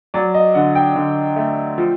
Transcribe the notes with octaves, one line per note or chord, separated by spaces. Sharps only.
F#3 D5
D#5
D3 F#5
G5
D3
A3
F3